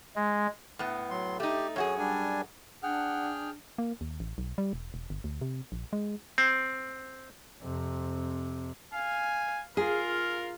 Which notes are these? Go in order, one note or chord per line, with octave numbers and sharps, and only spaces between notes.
G#3
A2 B3
F#3 C6
A3 D#4 G4
F#2 F#4 G#4 C#5
G3 D4 G#5
D4 G#4 F#5 G5 F6
A#3
D#2
A1
B1
G3
E1
E1
G1
D2
C3
A#1
G#3
C4
F2 C3
F5 G#5
F4 G#4 A#4 F5